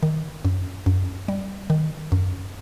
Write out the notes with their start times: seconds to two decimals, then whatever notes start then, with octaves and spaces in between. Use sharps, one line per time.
0.03 D#3
0.45 F#2
0.86 F#2
1.28 G3
1.70 D#3
2.12 F#2